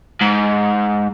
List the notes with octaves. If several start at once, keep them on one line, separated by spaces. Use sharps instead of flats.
G#2